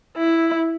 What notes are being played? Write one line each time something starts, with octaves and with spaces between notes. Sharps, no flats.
E4